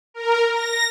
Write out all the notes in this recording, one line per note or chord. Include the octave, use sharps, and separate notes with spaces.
A#4
A#6